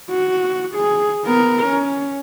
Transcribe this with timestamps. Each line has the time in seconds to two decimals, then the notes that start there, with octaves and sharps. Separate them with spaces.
0.10 F#4
0.74 G#4
1.24 B3 A#4
1.65 C#4